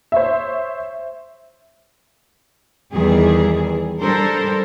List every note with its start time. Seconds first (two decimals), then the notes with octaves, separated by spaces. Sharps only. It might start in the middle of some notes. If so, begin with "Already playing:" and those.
0.12 C5 C#5 E5
2.92 E2 D#3 E3 G3 G#4
4.01 G3 D4 A4 A#4 C5